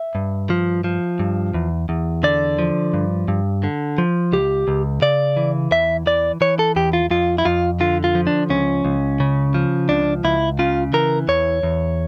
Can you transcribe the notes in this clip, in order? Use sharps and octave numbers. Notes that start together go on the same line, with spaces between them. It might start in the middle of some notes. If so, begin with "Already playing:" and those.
Already playing: E5
G2
F3
F3
G2
E2
E2
D3 D5
F3
G2
G2
D3
F3
C#2 G4
C#2
C#3 D5
E3
E2 E5
E3 D5
E3 C#5
A4
E2 G4
F4
F2 F4
E4
F2 F4
D3 F4
F4
F3
D4
C#2 C#4
C#2
C#3
F3
C#2 D4
C#2 E4
C#3 F4
E3 A#4
E2 C#5
E2